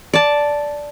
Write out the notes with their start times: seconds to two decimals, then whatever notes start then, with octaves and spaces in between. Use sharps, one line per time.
0.13 D5 A5